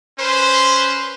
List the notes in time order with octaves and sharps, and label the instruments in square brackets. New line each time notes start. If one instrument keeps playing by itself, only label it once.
[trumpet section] C#4 B4 C5